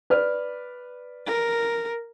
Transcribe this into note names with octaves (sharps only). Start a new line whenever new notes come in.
B4 D5 F6
A#4